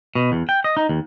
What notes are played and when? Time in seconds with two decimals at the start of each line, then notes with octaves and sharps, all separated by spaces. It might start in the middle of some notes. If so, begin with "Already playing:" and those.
0.15 B2
0.32 E2
0.49 G5
0.64 D#5
0.77 D#4
0.89 D#2